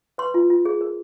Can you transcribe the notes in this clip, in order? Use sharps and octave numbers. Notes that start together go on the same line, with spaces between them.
B4 C6
F4
F4
G#4
A#4